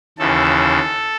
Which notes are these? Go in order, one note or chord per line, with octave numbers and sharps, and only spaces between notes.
D#2 C#3 E3 A4